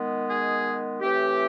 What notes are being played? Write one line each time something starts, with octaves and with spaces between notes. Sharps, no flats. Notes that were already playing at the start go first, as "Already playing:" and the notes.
Already playing: D#3 G#3 B3
G#4
A2 E3 A3 C4 G4